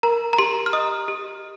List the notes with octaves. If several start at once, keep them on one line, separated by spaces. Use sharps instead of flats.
A#4 A#5
A#5
G4 C6
F6
D#5 D#6
G4